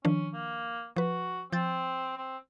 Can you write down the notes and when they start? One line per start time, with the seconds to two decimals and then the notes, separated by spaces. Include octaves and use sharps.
0.05 D#3 F3 C#4 D4
0.33 A#3
0.96 F3 F#4 B4
1.52 F3 C4 G6 A6
2.17 C4